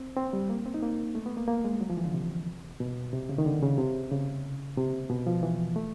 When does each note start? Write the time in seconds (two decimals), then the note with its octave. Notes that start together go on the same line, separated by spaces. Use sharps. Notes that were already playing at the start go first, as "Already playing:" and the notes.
Already playing: C4
0.17 C4
0.33 G3
0.50 A#3
0.66 C4
0.74 D#4
0.82 A#3
1.15 A3
1.26 B3
1.37 A#3
1.48 A#3
1.64 G#3
1.81 F#3
1.90 F3
1.97 E3
2.05 D3
2.14 C3
2.80 B2
3.13 C3
3.29 C#3
3.38 D#3
3.46 D3
3.63 C#3
3.78 C3
4.12 C#3
4.78 C3
5.10 B2
5.27 F3
5.43 E3
5.76 A3